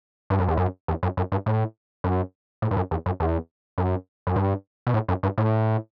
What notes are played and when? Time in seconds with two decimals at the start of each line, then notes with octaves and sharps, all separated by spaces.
0.30 G2
0.40 F#2
0.48 E2
0.57 F#2
0.88 E2
1.03 F#2
1.17 F#2
1.32 G2
1.46 A2
2.04 F#2
2.62 A2
2.71 G2
2.77 F#2
2.91 E2
3.06 F#2
3.20 E2
3.78 F#2
4.27 F#2
4.36 G2
4.87 B2
4.94 A2
5.08 F#2
5.23 G2
5.38 A2